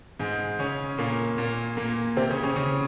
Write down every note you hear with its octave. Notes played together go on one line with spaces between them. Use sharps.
G#2 G#3
C#3 C#4
A#2 A#3
A#2 A#3
A#2 A#3
C3 C4
C#3 C#4
C#3 C#4
C#3 C#4